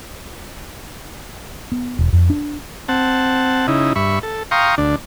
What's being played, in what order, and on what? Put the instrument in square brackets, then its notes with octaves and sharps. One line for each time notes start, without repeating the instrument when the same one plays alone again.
[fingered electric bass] B3
E1
F2
D4
[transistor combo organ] C4 F#5 A5
C#3 D#4 E4
G2 E5 B5 C#6
A4
F5 G5 A#5 C6 C#6 D#6
D2 D4